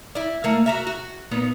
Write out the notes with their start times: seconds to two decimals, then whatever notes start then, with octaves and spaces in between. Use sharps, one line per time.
0.15 E4 D5
0.44 A3 A#3
0.66 F#4 A#4 E5
0.87 F#4
1.31 A#2 B3 D#4